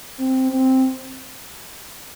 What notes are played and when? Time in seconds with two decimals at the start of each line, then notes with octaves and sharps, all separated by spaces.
0.19 C4
0.50 C4